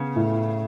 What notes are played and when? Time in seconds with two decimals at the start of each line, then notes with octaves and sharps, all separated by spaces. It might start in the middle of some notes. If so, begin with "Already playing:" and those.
Already playing: C#3 B3
0.16 A2